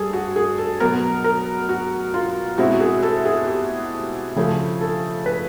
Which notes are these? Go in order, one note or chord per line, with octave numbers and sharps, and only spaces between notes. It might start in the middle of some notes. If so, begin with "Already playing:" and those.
Already playing: G2 G3 G#4 A4
F#4
G#4
A4
B2 F#3 B3 A#4
A#4
F#4
F4
B2 G#3 C4 E4 F#4
G#4
A4
G#4
G4
C#3 F3 A3 G#4
A4
B4